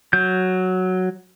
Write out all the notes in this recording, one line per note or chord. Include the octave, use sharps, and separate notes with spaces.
F#3 G6